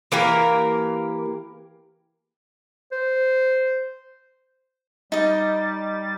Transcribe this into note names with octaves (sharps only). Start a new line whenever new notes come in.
E3 A#3 G4 A#4
C5
G3 D#4 D#5 A6